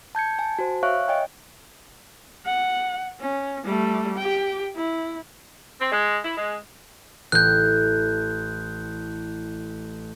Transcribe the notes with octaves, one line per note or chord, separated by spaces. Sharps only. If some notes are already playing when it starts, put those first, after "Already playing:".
A5 G6 G#6 C#7
G#5 A5
F#4 C5
C#5 E5 F5 C#6 F#6
C#5 D#5 G5 G#5
F#5
C#4
G3 A3
G4 G5
E4
C4
G#3
E4
G#3
A1 F#6 G6